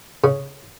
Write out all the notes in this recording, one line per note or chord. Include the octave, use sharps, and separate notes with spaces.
C#3